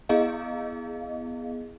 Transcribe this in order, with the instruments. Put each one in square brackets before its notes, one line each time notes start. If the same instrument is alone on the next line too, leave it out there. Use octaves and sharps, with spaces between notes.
[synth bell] B3 E4 G#4 D#5 F5